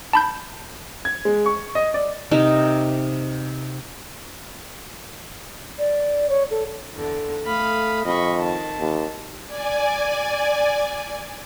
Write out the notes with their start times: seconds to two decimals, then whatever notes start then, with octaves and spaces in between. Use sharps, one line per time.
0.13 A5 B5 G6
1.05 G#6
1.25 G#3
1.46 C#6
1.75 D#5
1.94 D5
2.31 C3 D#4 A#4
5.78 D5
6.29 C#5
6.50 A4
6.92 E2 D3
7.47 A3 F5 B5 D#6
8.05 F2 D#5 B5 C#6
8.37 D#3 A5
8.80 D#2
9.47 D5 G#5